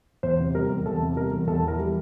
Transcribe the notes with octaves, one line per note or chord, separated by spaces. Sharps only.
E2 C5
C3
G3 A#4
E2
E2 A4
C3
G3 A#4
E2
E2 A4
E3
A#4
G3